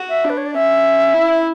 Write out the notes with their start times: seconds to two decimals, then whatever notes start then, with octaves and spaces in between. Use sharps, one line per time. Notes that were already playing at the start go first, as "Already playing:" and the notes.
Already playing: F#4
0.09 E5
0.25 D4 B4
0.37 C#5
0.46 D5
0.54 C#4 E5
1.14 E4